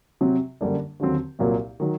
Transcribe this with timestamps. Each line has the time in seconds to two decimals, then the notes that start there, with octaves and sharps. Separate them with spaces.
0.21 C3 F#3 C4
0.61 F#2 D3 G3 A#3 D4
1.00 D#2 D3 F#3 C4
1.39 C2 A#2 F#3 A#3
1.80 D#3 F#3